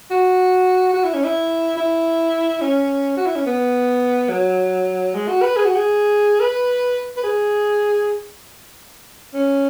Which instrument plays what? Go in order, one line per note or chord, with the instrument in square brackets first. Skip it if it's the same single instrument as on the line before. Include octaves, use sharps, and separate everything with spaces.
[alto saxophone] F#4
F#4
E4
C#4
E4
E4
C#4
F#4
E4
C#4
B3
F#3
G#3
F#4
B4
G#4
F#4
G#4
B4
B4
G#4
C#4